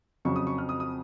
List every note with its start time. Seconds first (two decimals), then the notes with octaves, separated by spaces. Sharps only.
0.25 F2 C#3 F#3 C#6
0.36 D#6
0.47 C#6
0.58 F6
0.69 D#6
0.80 D#6